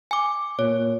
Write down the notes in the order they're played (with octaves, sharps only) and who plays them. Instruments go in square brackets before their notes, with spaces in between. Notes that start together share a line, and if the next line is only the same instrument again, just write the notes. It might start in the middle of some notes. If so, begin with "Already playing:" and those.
[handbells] G#5 D6
[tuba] A#2 [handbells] C#5